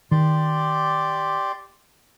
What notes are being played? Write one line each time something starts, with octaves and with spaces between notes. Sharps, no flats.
D#3 G4 D5 C6